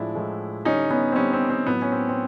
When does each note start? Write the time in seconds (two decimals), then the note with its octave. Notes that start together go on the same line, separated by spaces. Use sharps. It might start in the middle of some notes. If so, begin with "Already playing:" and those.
Already playing: A2 F3 G#3 D4 E4
0.14 A2 F3 G#3
0.65 D3 G3 C#4 D#4
0.90 B3 C#4
1.12 C4
1.16 D3 G3 B3 C#4
1.33 C4
1.50 C4
1.66 A2 F#3 B3
1.82 C#4
1.92 C4
2.09 C4